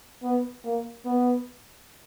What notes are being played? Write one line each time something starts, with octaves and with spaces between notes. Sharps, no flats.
B3
A#3
B3